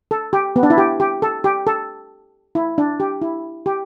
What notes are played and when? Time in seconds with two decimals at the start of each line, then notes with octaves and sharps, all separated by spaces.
0.11 A4
0.33 G4
0.56 B3
0.63 D4
0.70 E4
0.78 G4
1.00 G4
1.22 A4
1.44 G4
1.67 A4
2.55 E4
2.78 D4
3.00 G4
3.22 E4
3.66 G4